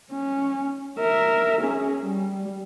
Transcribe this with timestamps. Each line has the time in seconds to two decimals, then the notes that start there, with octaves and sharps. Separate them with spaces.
0.11 C#4
0.99 A#4 E5
1.62 C#4 G#4
2.04 G3